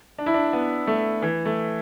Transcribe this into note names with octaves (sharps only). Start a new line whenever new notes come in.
D4
E4
D4
B3
A3
E3
A3